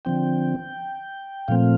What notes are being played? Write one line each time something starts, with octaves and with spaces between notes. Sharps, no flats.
D3 F3 C4 G5
A#2 F3 A3 C4 F5